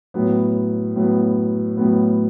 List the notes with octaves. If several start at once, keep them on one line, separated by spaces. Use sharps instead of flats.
A2 F#3 B3
A2 F#3 B3
A2 F#3 B3